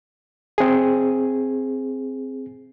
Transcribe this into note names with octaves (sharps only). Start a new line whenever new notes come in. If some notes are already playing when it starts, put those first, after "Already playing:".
C4 G#4